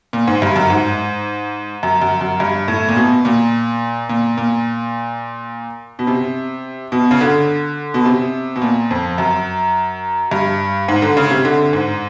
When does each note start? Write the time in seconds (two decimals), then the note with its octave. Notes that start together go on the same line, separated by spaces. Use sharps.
0.13 A#2
0.27 G#2
0.42 G2
0.56 F#2
0.70 G#2
1.83 F#2
2.02 F#2
2.21 F#2
2.40 G2
2.68 A2
2.88 A#2
2.96 B2
3.25 A#2
4.09 A#2
4.37 A#2
5.99 B2
6.07 C3
6.92 B2
7.11 C#3
7.21 D3
7.94 B2
8.05 C3
8.56 B2
8.61 A#2
8.91 F2
9.18 F#2
10.31 G2
10.88 G#2
11.02 D3
11.17 C#3
11.31 C3
11.45 D3
11.73 G#2